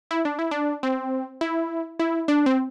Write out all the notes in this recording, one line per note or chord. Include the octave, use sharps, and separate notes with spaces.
E4
D4
E4
D4
C4
E4
E4
D4
C4